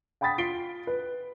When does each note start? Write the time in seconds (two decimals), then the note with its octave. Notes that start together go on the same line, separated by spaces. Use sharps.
0.21 F#5 G5 B5 D#6 A6 B6
0.38 F4 B6 C7 D7 G7
0.87 B4